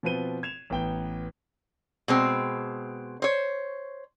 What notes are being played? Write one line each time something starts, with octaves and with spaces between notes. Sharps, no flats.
B2 F3 C4 B4 D#7 G7
G#6 E7 F7
A1 B3 G5 G7
B2 G#3 C4
C5 C#5